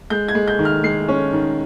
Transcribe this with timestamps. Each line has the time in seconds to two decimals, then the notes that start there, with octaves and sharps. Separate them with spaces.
0.10 G#3 G6
0.28 G#6
0.35 G#3
0.48 G6
0.59 D#3
0.65 F6
0.83 G#3 C7
1.08 C#4
1.33 D#3